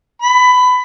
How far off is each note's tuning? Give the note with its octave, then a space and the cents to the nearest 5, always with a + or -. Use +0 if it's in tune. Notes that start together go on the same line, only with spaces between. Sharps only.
B5 +20